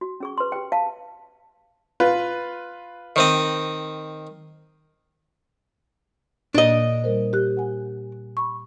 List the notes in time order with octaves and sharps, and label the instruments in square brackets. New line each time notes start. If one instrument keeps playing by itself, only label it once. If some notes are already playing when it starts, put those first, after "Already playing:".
[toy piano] F#4
C#4 G#4 C#6
B4 C6
G4 G5
F5 A5
[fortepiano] F4 B4
[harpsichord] D#3 C4 D#5
[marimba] A#2 A#3 [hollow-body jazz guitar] D4 D#5
[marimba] G3 A#4 C5
G4 F#6
F#5 G#5
B5 C#6